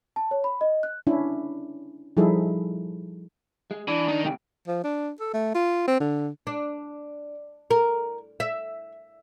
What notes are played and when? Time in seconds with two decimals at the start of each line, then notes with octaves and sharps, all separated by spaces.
0.16 A5
0.31 C#5
0.44 B5
0.61 D#5
0.83 F#6
1.07 C#4 D4 E4
2.17 F3 G3 D#4 E4 G#4 A4
3.71 G#3
3.88 E3 D4
4.08 D#3 D#4
4.24 C3 G#3 G5
4.67 F3
4.84 D4
5.20 A4
5.34 A3
5.55 F4
5.88 C4
6.00 D3
6.47 D4
7.71 A#4
8.40 E5